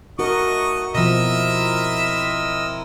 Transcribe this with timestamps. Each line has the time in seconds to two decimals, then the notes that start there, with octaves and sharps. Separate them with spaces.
0.19 A3 D#4 F#4 A#4 D#5 F#5 C#6
0.95 B2 F3 C4 E4 A#4 D#5 E5 E6